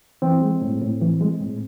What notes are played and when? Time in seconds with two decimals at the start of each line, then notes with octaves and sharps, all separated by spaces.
0.22 E3 C4
0.41 G#3
0.61 A2
0.82 A2
1.01 E3
1.20 G#3
1.40 A2